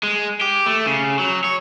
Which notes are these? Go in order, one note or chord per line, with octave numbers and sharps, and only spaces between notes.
G#3
G4
A3
C#3
F#3
C#5